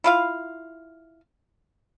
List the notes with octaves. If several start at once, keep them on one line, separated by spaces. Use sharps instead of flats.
E4 F4 F5